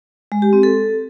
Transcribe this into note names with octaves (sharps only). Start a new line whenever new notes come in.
G#3
G4
C4
A4